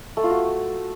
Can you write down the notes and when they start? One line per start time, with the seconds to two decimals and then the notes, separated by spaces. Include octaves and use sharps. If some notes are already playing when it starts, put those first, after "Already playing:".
0.17 A3
0.24 F4
0.30 F#4